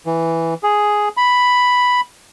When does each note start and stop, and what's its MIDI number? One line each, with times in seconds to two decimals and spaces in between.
0.06 0.54 52
0.63 1.09 68
1.17 2.01 83